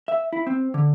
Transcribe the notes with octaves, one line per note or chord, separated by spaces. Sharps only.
E5
E4
C4
D3